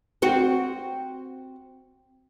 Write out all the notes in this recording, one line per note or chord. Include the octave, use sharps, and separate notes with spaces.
C4 F#4